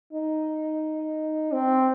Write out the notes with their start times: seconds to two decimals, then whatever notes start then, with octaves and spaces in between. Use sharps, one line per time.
0.13 D#4
1.52 C4